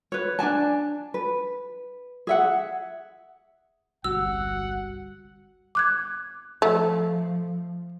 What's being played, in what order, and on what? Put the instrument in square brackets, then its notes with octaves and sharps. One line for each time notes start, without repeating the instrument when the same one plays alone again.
[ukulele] B4 C#5
D4 D5 G#5 A5
B4
G#4 E5 F#5
[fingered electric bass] G1 C2 [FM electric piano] G3 F#4 [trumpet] F#5 [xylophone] E6
[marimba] D6 F#6 G#6
[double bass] F3 [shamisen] A3